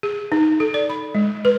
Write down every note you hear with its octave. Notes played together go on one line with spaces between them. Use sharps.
G#4
D#4
A4
D5
B5
G#3
B4